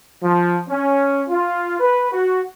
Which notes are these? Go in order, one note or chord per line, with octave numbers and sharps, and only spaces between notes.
F3
C#4
F4
B4
F#4